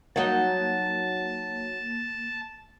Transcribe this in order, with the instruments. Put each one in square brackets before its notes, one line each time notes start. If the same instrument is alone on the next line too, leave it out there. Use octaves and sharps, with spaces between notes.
[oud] F#3 D#4 [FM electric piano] A#3 [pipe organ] A5